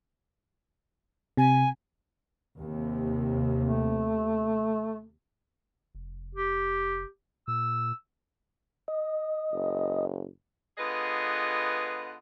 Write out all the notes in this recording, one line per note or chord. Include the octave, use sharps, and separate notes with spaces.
C3 G#5
D#2 C3
A3
F1
G4
A#2 E6
D#5
F#1
D3 B3 F4 G#4 B4 D#5